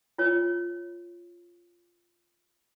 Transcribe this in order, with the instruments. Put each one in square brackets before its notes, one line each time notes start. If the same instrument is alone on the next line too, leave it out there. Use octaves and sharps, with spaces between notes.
[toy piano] F4 C#5